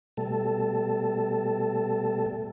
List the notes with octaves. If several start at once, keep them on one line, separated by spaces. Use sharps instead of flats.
B2 G3 A3 A4